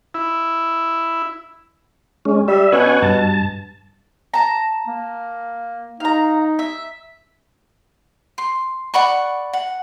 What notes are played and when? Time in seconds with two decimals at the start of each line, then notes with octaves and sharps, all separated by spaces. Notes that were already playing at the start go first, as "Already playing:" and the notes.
0.14 E4
2.25 G#3 C#4
2.48 G3 E5
2.72 B2 C#4 F#5 G#5
3.02 G2 A5
4.34 A5 A#5
4.87 A#3
6.00 D#4 F5 A#5
6.59 E5
8.38 C6
8.94 D5 F#5 B5 C#6
9.53 F#5